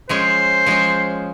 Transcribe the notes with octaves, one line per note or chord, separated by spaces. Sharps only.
F3 G#3 C#4 C5
F3 G#3 C#4